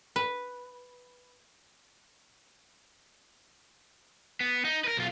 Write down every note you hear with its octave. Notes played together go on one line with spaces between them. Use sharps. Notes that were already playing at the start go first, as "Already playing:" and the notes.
B4
B3
D#4
A#4 B4
B1 F4